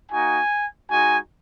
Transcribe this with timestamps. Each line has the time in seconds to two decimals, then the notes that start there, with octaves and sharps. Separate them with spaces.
0.12 A#3 D#4 F#4 G#5
0.91 G#3 D#4 F#4 G#5